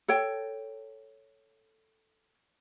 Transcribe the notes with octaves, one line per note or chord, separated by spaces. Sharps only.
A4 C#5 G5